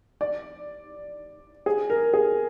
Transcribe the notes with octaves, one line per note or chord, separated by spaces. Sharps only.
D5
G#4
A#4
G#4